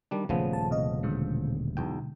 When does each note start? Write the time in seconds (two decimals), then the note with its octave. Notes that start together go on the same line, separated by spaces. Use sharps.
0.11 D#3 G3 D4
0.29 D#1 C#3 F3 A3 B3
0.53 A5
0.71 C3 D#5
1.03 B2 D3 G#3
1.77 B1 E2 G5